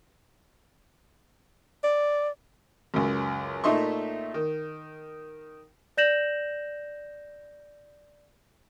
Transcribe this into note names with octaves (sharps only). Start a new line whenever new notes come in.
D5
C#2 F#2
A#2 A3 D#4 E5 C6 C#6
D#3
D5 G6 A#6 E7 F#7